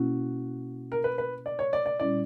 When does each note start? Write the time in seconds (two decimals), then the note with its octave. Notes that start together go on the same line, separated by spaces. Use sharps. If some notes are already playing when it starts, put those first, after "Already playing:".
Already playing: B2 A#3 C#4 E4 F#4
0.92 A#4
1.04 B4
1.18 B4
1.46 D5
1.59 C#5
1.73 D5
1.86 D5
1.99 A#2 G3 C#4 E4 D5